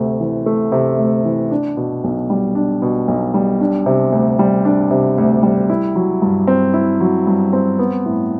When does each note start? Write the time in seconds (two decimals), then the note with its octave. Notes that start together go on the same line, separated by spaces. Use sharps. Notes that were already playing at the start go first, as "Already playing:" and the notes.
Already playing: D2 C3 A3
0.20 E3
0.46 A3
0.72 C3
0.99 D2
1.25 E3
1.51 D4
1.77 B2
2.04 B1
2.30 G3
2.55 D4
2.82 B2
3.08 B1
3.34 G3
3.61 D4
3.86 C3
4.12 D2
4.39 G3
4.65 D4
4.91 C3
5.18 D2
5.43 G3
5.70 E4
5.96 F#3
6.22 G2
6.47 C4
6.74 E4
7.01 F#3
7.27 G2
7.53 C4
7.79 B3
8.06 A2